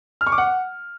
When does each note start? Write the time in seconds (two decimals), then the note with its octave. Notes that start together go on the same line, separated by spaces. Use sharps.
0.21 F6
0.27 C#6
0.32 D6
0.38 F#5